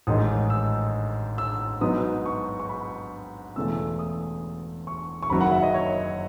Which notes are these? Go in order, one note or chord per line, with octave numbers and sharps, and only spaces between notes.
A1 G#2 D#3 G#3 D#4 D#6
E6
E6
G#2 F#3 B3 D#4 D#6
C#6
C#6
B5
E1 E2 C#3 E3 A3 E6
D#6
C#6
C#6
F#1 F#2 D#3 F#3 B5
F#5
E5
D#5
C#5